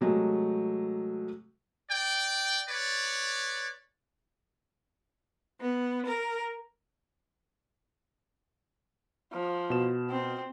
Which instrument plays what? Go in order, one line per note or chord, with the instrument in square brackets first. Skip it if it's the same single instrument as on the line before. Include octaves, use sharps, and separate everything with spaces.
[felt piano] C3 F#3 G#3 A3
[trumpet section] D5 G5
B4 C#5 D5
[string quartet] B3
A#4
[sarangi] F3
[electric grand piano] B2 E7
[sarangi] C4